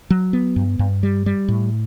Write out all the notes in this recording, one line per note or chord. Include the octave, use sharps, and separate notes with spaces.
F#3
B3
G2
G2
G3
G3
A2